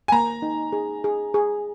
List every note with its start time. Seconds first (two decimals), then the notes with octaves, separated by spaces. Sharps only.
0.08 G#5
0.12 A#3 A#5
0.42 D#4
0.73 G#4
1.04 G#4
1.34 G#4